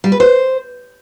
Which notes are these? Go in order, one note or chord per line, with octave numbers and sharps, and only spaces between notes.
G3
B4
C5